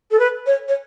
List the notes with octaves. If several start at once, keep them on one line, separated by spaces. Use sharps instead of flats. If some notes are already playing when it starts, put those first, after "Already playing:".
A4
B4
C#5
C#5